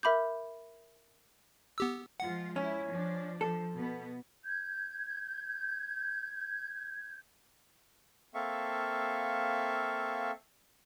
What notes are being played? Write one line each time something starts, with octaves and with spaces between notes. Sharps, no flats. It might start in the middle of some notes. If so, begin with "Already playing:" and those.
A#4 E5 B5 D6 G6
B3 G4 E6
F3 G#3 F4 F#5
C#4 E4
F3 D4
F3 A4
B2 B3
G6 G#6
A#3 C4 A4 E5 F5 C#6